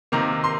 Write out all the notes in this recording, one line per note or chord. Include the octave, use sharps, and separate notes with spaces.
C3 D#3 A#3 A#5
C6